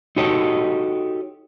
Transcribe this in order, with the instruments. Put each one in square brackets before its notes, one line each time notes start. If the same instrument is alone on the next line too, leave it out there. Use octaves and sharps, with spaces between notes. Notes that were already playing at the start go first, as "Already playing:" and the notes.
[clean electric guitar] D#4 F#4 G4 A4 C#5 D#5